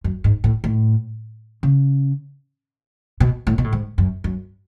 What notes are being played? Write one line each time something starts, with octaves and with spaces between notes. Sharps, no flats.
F#2
G#2
A2
A2
C#3
B2
A2
B2
A2
G#2
F#2
F#2